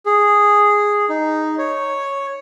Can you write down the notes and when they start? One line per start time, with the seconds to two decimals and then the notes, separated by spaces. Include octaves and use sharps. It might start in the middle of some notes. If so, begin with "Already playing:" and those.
0.06 G#4
1.09 D#4
1.58 C#5